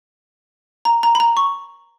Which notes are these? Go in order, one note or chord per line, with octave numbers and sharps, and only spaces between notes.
A#5
A#5
B5
A#5
C#6